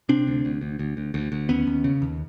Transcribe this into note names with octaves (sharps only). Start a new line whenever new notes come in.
C3 C4 D4
D2
D2
D2
D2
D2
D2
D2
D#2 B3 C#4
D#2
C#3
D#2